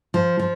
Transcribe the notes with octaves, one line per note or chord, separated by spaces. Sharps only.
F3
F3